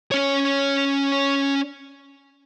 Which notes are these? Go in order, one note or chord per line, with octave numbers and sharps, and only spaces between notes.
C#4 C#5